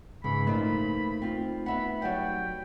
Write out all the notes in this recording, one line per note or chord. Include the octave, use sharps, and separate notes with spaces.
G#2 C#3 E3 G#3 B5
A#2 F3 A3 D#4 B5
C4 F4
B3 E5 F#5 B5
F#3 G3 F#5 G5